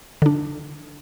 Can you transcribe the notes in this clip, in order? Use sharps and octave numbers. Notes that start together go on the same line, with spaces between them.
D3 D4